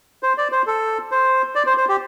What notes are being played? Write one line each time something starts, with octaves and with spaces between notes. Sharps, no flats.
C5
D5
C5
A4
C5
D5
C5
C5
G4